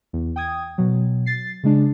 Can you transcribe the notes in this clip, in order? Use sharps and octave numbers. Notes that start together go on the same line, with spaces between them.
E2
G5 D#6 G#6
B2 F#3
A6 C7
C#3 G#3 D4